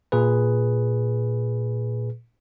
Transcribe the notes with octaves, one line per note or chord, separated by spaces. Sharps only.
A#2 G#4 B4